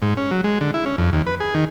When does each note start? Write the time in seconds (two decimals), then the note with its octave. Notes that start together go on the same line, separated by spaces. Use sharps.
0.02 G#2
0.17 C#4
0.31 F#3
0.44 G#3
0.61 D3
0.74 E4
0.86 C#4
0.98 F2
1.13 D#2
1.27 B4
1.40 G#4
1.55 D#3